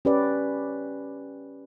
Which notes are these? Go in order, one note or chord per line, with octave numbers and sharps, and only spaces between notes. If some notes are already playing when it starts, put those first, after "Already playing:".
C#4 G4 B4 D5